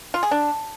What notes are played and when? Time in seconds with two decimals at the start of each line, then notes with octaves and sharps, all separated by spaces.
0.14 F4
0.23 G#4
0.31 D4